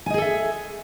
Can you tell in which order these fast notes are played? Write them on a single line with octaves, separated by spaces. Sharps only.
G#5 D#5 G#4 A4 E5